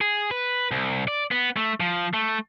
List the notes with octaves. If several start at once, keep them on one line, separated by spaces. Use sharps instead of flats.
G#4
B4
C2
D5
B3
A3
F3
A3